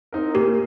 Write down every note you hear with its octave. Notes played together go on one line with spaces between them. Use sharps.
C4 D#4 A#4
A#2 G4 A#4